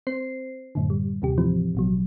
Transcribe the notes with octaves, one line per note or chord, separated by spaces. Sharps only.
C4 C5 C7
F#2 A2 D3
G3
D#2 C3 G4
A2 E3 F3 C4
A1 B2 F#3